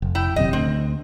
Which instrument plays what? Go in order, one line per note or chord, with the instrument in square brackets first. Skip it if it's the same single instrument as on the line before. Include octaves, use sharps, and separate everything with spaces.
[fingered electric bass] F1
[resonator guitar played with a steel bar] E4 G5
[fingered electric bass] D#1 F#2 C3 [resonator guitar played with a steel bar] D#5
[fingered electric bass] D2 [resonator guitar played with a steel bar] C4